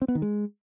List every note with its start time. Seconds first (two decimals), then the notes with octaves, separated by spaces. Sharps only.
0.02 C4
0.08 B3
0.15 D#3
0.22 G#3